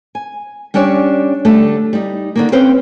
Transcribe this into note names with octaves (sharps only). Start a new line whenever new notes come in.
G#5
G3 C#4 D4 G4 C#5
D3 G3 A3
G3 D#4
D3 D#3 A#3
C4 C#4 B4 C5 F5 G5